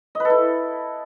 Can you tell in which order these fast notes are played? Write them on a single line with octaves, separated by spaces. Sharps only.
D#5 B4 A4 E4